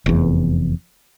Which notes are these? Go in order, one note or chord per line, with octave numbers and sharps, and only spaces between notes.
F1 E2